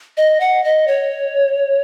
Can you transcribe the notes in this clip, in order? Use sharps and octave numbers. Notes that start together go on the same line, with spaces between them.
D#5
F#5
D#5
C#5